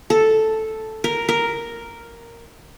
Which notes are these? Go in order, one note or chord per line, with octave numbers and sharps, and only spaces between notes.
A4
A#4
A#4